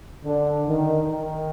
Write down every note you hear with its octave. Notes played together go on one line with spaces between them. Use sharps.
D3
D#3
D#3